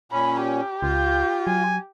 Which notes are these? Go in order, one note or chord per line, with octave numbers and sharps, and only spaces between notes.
A#2 C#4 B5
G4
C#2 F4 G6
F#3 G#5